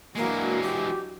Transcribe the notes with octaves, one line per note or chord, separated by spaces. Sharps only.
E3 F#3 G#3 A#3 D4 F#4
G4